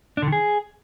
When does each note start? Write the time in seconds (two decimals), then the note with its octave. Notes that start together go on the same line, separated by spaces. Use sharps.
0.17 D4
0.22 D3
0.27 D#3
0.32 G#4